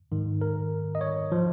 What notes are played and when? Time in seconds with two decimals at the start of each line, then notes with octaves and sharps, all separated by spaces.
0.12 G#2 D#3
0.41 A#4
0.95 D#5
1.01 C#5
1.32 F3